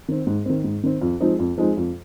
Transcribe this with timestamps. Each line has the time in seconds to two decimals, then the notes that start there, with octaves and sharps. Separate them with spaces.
0.08 D#3 C4
0.27 G#2
0.46 D#3 C4
0.64 G#2
0.83 D#3 C4
1.02 F2
1.21 F3 G#3 C4 D#4
1.39 F2
1.58 F3 G#3 C4 D#4
1.77 F2